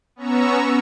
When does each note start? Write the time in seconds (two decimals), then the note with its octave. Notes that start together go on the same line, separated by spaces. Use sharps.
0.16 B3 C#4 A#5 C#6 E6